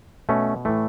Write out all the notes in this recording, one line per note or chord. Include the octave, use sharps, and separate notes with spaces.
B2 A3 C#4
A2 E3 A3